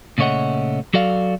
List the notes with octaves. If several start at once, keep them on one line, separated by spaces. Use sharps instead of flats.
A#2 C#3 A3 C#5 D#5 F#5
F#3 F#4 A4 D5 F5